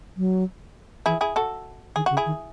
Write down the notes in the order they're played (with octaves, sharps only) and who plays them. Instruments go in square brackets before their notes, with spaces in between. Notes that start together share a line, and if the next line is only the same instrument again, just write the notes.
[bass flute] F#3
[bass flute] E3 [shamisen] E4 G#4
[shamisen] E4 G#4
F#4 A4
[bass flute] D#3 [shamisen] G#4
[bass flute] C#3 [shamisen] F#4
[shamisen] E4 G#4
[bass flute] D#3